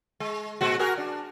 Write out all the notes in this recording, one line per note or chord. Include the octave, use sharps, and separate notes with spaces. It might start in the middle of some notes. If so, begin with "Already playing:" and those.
G#3
A#2 G#3 F#4
F#4 G#4 A#4
D4